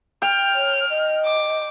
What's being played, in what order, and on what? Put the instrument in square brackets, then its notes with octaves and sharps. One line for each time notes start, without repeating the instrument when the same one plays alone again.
[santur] G5 [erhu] F6
[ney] C#5
D#5
[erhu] D6